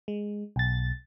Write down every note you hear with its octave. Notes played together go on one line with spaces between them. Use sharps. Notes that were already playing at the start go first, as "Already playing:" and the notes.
G#3
B1 A6